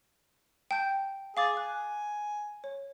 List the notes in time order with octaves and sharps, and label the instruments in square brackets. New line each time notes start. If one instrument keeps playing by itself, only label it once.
[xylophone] G5 A5 G6
[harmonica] G#4 [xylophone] F5 D6 A6
[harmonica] G#5 [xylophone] F#6
[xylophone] C#5